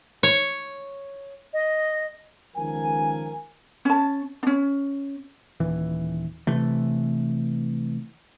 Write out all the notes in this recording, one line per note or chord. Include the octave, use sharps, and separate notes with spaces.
C#5
D#5
C#2 D#3 F3 A#4 G#5
C#4 A5
C#4 D4
D#1 E3
C3 E3 A3